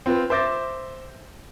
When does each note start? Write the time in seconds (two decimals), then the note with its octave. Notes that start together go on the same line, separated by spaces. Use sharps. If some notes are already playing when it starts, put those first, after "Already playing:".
0.06 C4 F4 B4
0.30 C5 E5 D6 G6 A6 A#6